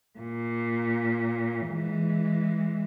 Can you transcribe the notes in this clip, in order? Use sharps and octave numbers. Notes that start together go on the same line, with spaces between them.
A#2
E3 G#3